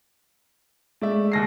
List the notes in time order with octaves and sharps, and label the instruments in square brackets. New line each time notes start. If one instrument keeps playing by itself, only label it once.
[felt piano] G#3 [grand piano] A3 D5 E5
[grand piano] D#2 A#6 C7